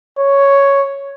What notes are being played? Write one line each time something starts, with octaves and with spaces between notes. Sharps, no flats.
C#5